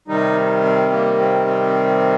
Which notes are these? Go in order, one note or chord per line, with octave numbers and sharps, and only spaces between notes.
C3 D#3 G3 D#4
C4
A#3
C4
C4